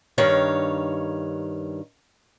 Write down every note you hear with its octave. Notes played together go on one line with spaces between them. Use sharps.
G2 D#3 C#5 F5